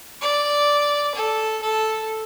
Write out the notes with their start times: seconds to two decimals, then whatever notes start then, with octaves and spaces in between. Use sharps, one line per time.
0.22 D5
1.15 A4
1.63 A4